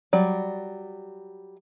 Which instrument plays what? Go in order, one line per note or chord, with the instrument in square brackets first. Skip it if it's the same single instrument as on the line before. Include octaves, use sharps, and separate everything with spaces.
[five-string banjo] F#3 G3 D5